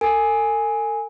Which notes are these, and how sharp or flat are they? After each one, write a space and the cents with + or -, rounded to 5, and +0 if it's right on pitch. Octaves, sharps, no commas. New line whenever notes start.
A4 +45 G#5 +0